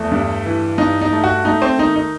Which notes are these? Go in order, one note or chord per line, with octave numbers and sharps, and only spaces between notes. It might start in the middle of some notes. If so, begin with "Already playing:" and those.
Already playing: E2 A3
G2
E3
G2 D#4
D#4
A3
F#4
A3 D#4
C4
D#3 D#4
D#4